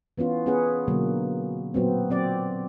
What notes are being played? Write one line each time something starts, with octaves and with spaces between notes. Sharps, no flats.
E3 B3 C#4 F4
B3 C#4 G#4 B4 F#5
B2 D3 F#3 A#3
A#2 F#3 B3 C4
F#3 C4 D5